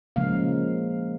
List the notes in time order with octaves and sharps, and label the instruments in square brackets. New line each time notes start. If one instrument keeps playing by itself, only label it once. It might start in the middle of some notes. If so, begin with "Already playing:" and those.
[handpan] C#3 F3 G#3 A#3 F5